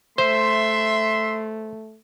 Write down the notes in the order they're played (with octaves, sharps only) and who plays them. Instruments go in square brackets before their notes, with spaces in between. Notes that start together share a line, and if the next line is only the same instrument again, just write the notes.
[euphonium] A3 [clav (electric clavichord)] C5 [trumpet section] E5 [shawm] C6